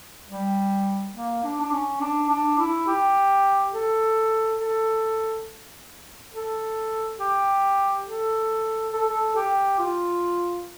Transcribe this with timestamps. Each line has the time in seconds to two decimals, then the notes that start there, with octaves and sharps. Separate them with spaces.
0.28 G3
1.15 A#3
1.44 D4
1.61 D4
1.72 C#4
2.01 D4
2.30 D4
2.59 E4
2.87 G4
3.74 A4
4.60 A4
6.33 A4
7.20 G4
8.07 A4
8.93 A4
9.08 A4
9.36 G4
9.79 F4